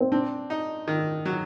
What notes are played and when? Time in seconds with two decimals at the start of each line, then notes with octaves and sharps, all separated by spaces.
0.01 C4
0.12 C4 D4
0.50 D#4
0.88 D#3
1.26 F#3